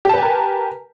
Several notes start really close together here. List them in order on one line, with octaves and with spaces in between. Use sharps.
G4 A5 B4 G#5 A#4